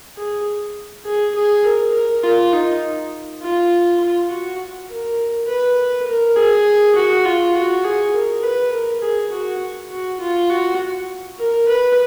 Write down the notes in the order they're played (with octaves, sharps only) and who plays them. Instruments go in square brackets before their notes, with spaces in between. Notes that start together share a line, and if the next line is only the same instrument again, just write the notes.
[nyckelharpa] G#4
G#4
G#4
A#4
A#4
F4
D#4
F4
F4
F#4
A#4
B4
A#4
G#4
F#4
F4
F#4
G#4
A#4
B4
A#4
G#4
F#4
F#4
F4
F#4
A#4
B4